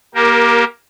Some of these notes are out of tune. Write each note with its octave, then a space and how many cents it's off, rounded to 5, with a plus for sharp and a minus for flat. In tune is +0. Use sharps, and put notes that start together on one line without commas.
A#3 +25 G4 +0 A#4 +0